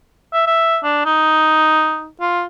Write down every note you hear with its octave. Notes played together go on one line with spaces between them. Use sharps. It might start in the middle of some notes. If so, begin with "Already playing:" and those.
E5
E5
D4
D#4
F4